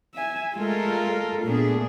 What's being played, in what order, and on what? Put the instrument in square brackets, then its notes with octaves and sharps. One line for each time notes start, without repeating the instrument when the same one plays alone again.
[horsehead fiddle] E5 G#5
[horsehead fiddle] G#3 A3 [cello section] F4 A4 A#4
[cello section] A#2 D4 G#4 [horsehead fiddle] A3 B3